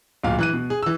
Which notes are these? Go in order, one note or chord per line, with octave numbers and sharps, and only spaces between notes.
D1 A#2 F5
E3 F#6 D#7
B2
G#4
E3 E6